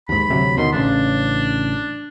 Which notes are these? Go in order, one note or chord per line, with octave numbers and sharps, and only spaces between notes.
D#2 G#2 B5
D2 C3 F#3
D2 B2 D#3 C6
A1 C#3 D4